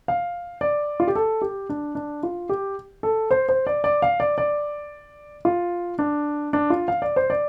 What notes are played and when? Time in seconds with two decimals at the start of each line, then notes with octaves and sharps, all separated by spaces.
0.08 F5
0.61 D5
1.00 F4
1.07 G4
1.15 A4
1.42 G4
1.69 D4
1.95 D4
2.23 F4
2.49 G4
3.03 A4
3.31 C5
3.49 C5
3.67 D5
3.84 D5
4.02 F5
4.20 D5
4.38 D5
5.45 F4
5.99 D4
6.53 D4
6.70 F4
6.88 F5
7.02 D5
7.16 C5
7.30 D5